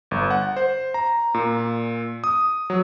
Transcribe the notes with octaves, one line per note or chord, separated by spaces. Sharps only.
G1
F#5
C5
A#5
A#2
D#6
F#3